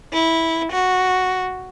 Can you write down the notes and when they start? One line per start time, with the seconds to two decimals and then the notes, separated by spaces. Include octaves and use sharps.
0.13 E4
0.72 F#4